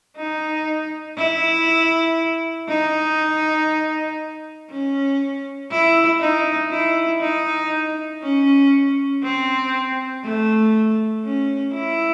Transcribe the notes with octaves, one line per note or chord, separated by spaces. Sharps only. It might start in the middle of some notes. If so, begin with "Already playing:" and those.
D#4
E4
D#4
C#4
E4
D#4
E4
D#4
C#4
C4
A3
C#4
E4